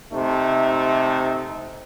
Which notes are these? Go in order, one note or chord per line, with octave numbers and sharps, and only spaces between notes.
C3 A3 D#4